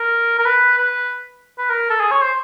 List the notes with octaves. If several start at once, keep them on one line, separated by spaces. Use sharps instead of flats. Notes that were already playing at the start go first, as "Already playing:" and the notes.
Already playing: A#4
A#4
B4
B4
B4
A#4
A4
G#4
C#5
C5